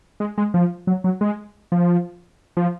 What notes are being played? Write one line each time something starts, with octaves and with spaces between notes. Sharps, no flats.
G#3
G#3
F3
F#3
F#3
G#3
F3
F3